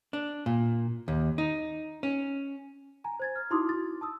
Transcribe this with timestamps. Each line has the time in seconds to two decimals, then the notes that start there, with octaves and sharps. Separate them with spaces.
0.13 D4
0.46 A#2
1.08 D#2
1.38 D#4
2.03 C#4
3.04 G#5 A#5
3.20 C5 G#6 A6
3.36 F6
3.50 D#4 E4 F#4 C6 D6 D#6
3.69 A6
4.01 A5 D#6 E6